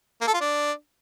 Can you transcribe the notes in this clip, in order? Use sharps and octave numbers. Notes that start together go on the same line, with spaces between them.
A#3
A4
F4
D4